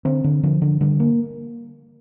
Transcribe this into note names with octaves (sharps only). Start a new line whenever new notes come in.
D3 C4
D3
D3 F3
D3
D3 G3
A#3